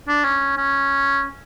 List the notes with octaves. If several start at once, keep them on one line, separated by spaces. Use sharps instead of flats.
D4
C#4
C#4